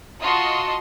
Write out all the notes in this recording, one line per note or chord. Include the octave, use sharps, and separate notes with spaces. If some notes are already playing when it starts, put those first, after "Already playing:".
F4 F#4 D#5 A5 C6